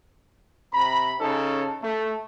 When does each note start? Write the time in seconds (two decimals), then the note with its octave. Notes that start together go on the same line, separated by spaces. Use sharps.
0.73 C3 A#5 B5
1.21 C#3 C#4 D#4 A4
1.83 A3